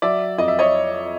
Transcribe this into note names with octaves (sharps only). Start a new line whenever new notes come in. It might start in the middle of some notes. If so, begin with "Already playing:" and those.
F#3 D5 E5
F2 D#5
E5
C#5 D#5